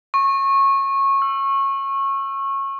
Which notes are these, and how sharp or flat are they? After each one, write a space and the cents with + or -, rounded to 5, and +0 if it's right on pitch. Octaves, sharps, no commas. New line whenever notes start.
C#6 -20
E6 +20